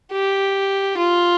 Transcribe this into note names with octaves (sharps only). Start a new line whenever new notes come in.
G4
F4